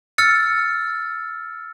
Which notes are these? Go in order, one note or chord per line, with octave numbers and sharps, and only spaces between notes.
E6 F6 A6 C#7